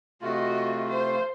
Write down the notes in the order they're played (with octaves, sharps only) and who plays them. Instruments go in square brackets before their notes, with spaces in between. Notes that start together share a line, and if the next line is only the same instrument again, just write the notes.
[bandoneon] C3 A3 F4 [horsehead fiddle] F#4 D#5
[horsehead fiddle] C5